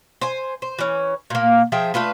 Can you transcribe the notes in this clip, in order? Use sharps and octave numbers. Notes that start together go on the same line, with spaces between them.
C5 G#5
C5
E3 C#4
A#2 A#3
F3 G#4 E5 G5
A3 D4 F4 B4